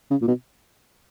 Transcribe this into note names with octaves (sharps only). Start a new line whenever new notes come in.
C#3
A#2
B2